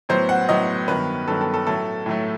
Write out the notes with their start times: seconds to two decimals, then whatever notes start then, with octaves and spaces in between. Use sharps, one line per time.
0.09 A2 F#3 B3 C5
0.29 F#5
0.49 A2 F#3 B3 D#5
0.88 G2 D#3 F#3 B3 B4
1.27 G2 D#3 F#3 B3 A4
1.41 A4
1.54 A4
1.67 A2 F#3 A3 A4
2.06 A2 F#3 A3